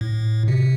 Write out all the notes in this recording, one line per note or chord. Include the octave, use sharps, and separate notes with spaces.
A2
C3